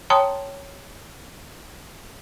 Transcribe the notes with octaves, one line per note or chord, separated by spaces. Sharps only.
C#5 G5 A5 A#5 C6 D#6